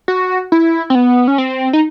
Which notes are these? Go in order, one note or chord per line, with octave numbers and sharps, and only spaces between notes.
F#4
E4
C4
B3
C#4
C4
D#4